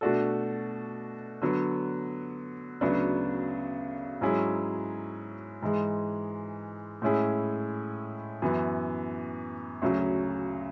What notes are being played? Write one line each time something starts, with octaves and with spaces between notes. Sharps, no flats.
B2 A3 D4 F#4 A4
D3 F#3 B3
D2 C#3 F#3 B3 D4
G#2 F#3 C#4 E4 G#4
G#2 E3 G#3
A2 G#3 C#4 E4 G#4
F#2 E3 B3
D2 C#3 F#3 C#4